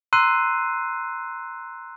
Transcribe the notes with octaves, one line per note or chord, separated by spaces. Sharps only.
A#5 C6 E6 F#6 C7 D#7